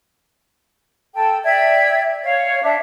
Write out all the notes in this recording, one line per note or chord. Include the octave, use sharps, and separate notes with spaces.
A4 G5
D5 E5 G5 G#6
C#5 F5
D4 E5